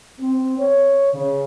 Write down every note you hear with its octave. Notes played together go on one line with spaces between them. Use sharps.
C4
C#5
C#3